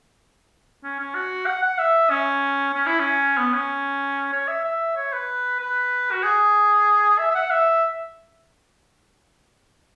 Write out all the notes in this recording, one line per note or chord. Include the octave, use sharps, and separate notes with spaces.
C#4
C#4
F#4
F#5
F#5
E5
C#4
C#4
E4
C#4
B3
C#4
C#5
E5
E5
C#5
B4
B4
F#4
G#4
E5
E5
F#5
E5